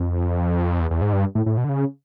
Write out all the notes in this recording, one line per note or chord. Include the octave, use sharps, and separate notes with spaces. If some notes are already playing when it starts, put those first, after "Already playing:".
Already playing: F2
E2
E2
G#2
G2
A2
A2
B2
D3
C#3